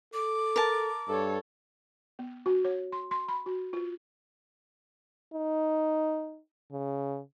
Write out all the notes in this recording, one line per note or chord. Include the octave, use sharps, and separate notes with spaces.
A4 D6
A#4 A5
G2 A4 C#5
B3
F#4
C#5
C6
C6
B5
F#4
F4
D#4
C#3